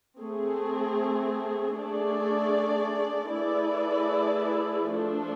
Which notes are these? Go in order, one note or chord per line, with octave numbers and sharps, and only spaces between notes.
A3 C4 G#4
A3 D4 G#4 D5
A3 E4 G#4 B4 D5
F3 A3 D4 A4